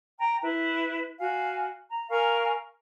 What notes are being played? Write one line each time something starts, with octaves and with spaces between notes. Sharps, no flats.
G5 A#5
E4 B4
F#4 F5 G#5
A#5
A#4 F5 G#5 C#6